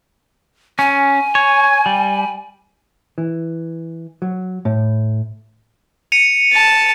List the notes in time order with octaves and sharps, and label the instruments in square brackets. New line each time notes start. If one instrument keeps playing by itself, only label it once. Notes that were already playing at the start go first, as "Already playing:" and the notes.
[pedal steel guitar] C#4 [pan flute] G#5
[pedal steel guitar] C#5
G3
[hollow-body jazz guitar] E3
F#3
A2
[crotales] C#7 D#7 F7
[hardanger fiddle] A5